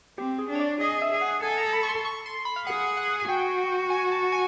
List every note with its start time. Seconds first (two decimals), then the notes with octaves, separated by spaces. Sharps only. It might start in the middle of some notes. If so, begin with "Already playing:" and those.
0.18 C4 G4
0.38 G#4
0.49 D4
0.55 C#5
0.59 D5
0.81 G#4 D#5
1.02 E5
1.11 G#4
1.21 F#5
1.42 A4 G#5
1.58 A#5
1.73 B5
1.83 C#6
1.88 C6
2.05 C#6
2.26 C6
2.45 B5
2.56 F5
2.67 G#4 F#5
2.97 F#5
3.20 G#5
3.29 F#4 G5
3.90 G#5
4.12 A5
4.32 G#5